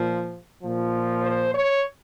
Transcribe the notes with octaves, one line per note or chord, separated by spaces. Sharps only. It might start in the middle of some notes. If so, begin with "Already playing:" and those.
Already playing: A#2 F3
A#2 F3
C5
C#5